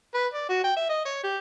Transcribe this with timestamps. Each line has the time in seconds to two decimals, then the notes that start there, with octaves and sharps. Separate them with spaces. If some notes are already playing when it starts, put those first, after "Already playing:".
0.14 B4
0.33 D5
0.49 F#4
0.64 G5
0.76 E5
0.89 D#5
1.05 C#5
1.23 G4